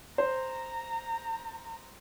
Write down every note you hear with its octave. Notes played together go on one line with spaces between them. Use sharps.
C5 A#5